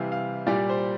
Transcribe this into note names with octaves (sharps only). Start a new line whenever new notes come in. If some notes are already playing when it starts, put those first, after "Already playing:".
Already playing: C3 E3 G3 F5
F5
A#2 G3 D5
C5